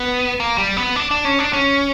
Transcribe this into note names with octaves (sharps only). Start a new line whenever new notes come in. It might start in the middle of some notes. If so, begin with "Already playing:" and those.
Already playing: B3
A#3
G3
B3
D4
D4
C#4
D4
C#4